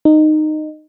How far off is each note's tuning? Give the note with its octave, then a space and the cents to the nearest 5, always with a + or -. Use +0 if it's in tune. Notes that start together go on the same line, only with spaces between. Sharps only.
D#4 -15